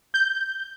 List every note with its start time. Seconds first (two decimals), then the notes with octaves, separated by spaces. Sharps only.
0.14 G6